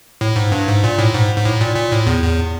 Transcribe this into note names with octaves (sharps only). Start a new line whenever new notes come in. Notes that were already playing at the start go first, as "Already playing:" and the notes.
A2
G#2
G2
G#2
A#2
A2
G#2
G#2
A2
A#2
A#2
A2
E2
E2